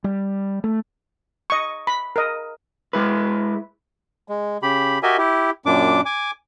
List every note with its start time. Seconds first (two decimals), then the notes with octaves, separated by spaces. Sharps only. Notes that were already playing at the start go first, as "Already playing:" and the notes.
0.04 G3
0.64 A3
1.50 D#5 C#6
1.87 B5
2.16 A#4 D#5
2.93 G#3 E4 B4
4.28 G#3
4.62 C#3 G4 B5
5.03 F#4 G4 A#4 D#5 E5 G#5
5.18 E4 G4
5.66 F#2 A#2 D4 D6
6.05 G#5 D6